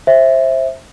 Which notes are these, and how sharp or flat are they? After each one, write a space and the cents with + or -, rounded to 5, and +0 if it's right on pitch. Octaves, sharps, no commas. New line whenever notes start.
C5 +20 E5 +0